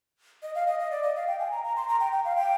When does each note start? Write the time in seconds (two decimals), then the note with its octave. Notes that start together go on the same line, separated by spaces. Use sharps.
0.43 D#5
0.55 F5
0.67 D#5
0.80 D#5
0.91 D5
1.03 D#5
1.16 F5
1.27 G5
1.39 G#5
1.52 A#5
1.64 A#5
1.76 C6
1.88 A#5
2.00 G5
2.13 G5
2.25 F5
2.36 G5